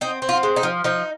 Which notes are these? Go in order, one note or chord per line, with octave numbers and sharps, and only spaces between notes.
C4 D#4
C4
F4
G#3
D#4
F3
F3 D#4